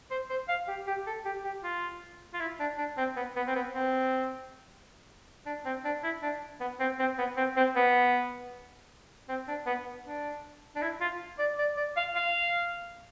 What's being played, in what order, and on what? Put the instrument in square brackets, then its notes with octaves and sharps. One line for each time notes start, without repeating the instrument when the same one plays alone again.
[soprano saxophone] C5
C5
F5
G4
G4
A4
G4
G4
F4
F4
E4
D4
D4
C4
B3
B3
C4
B3
C4
D4
C4
D4
E4
D4
B3
C4
C4
B3
C4
C4
B3
C4
D4
B3
D4
D4
E4
F4
D5
D5
D5
F5
F5